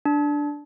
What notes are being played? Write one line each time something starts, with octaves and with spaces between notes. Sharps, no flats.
D4